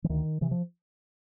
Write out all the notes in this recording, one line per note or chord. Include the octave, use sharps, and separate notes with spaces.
E3
D2 D#3
C3 E3
F3